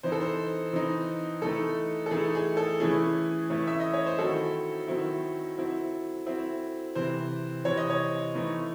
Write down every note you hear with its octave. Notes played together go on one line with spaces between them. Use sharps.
E3 C4 D#4 C5
A4
C5
E3 C4 D#4
E3 A3 D#4 A4
A4
E3 A3 D#4 G#4
G#4
A4
E3 A3 C#4 E4 G#4
E3 A3 C#4 E4
E5
D#5
C#5
C5
D#3 F#3 C4 E4 A4
D#3 F#3 C4 E4
F#3 C4 E4
F#3 C4 E4
C3 E3 C4 C5
C3 E3 C4 C#5
D#5
C#5
E3 A3 D#4